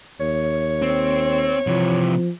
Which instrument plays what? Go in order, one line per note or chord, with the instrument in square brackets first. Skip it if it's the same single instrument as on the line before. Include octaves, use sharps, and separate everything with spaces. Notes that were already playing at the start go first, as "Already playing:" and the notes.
[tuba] D#2 [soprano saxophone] C#5
[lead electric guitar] C4
[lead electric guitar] C3 E3 [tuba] F3